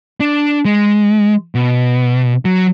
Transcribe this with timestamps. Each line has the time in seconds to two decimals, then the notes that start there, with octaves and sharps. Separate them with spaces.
0.20 D4
0.65 G#3
1.55 B2
2.45 F#3